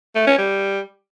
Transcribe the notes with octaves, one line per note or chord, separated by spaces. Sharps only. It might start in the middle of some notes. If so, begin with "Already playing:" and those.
A3
C#4
G3